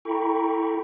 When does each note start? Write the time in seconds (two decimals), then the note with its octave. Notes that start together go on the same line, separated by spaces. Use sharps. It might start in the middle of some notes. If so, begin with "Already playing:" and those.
0.05 E4 A4 G5 A#5 B5 C#6